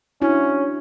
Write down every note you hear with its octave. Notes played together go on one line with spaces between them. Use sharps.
C#4 D4 E4 F#4